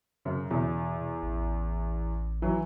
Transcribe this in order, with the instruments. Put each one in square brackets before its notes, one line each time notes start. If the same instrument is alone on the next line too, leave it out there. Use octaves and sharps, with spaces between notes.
[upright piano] F#2 [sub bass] C#3
[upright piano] E2 [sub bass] B2
[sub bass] A1
[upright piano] E3 F#3